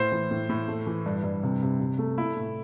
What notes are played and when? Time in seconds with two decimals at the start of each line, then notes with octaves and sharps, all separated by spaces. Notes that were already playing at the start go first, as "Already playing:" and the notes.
Already playing: A2 C5
0.12 E3
0.31 A2
0.49 A2
0.68 A3
0.87 E3
1.06 G2
1.24 G2
1.43 C3
1.62 C3
1.80 C3
1.99 A3
2.18 A3 E4
2.36 A2